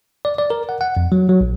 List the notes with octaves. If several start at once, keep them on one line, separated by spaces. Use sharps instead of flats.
D5
D5
A#4
F#5
F#5
F2
F#3
F#3
A#1